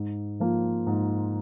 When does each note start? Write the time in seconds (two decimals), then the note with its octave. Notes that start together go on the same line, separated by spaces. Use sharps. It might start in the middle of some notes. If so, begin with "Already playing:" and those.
Already playing: G#2
0.40 F3 A#3 F4
0.87 G#2